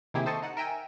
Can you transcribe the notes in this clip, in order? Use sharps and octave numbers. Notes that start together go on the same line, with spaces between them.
C3 D#3 A#3 E4 G4 G#4
A4 C5 D#5 A5 C#6
D#4 F#5
A#4 E5 G5 G#5